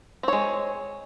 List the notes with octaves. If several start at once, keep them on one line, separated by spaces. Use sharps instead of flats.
G#3 C4 C#5